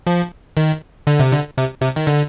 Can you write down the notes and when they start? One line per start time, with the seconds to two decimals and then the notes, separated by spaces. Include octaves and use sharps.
0.07 F3
0.57 D#3
1.07 D3
1.20 C3
1.33 D3
1.57 C3
1.81 C3
1.96 D#3
2.07 D3